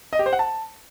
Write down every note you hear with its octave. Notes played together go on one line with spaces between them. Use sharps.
D#5
G4
C5
F#5
A5